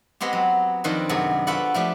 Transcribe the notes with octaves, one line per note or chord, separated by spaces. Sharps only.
G#3 B3 C4 G4
F#3
F2 D#3 C4 D4 B4
F#2 C3 B3 G#4
F4 F#4 A4 B4 D5 F#5
F3 A3 D4 G4